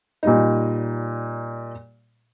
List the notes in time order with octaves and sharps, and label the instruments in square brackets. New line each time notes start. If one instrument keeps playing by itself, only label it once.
[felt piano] A#2 G3 D#4